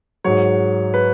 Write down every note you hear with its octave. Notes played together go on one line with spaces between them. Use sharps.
G#2 F#3 C#5
B4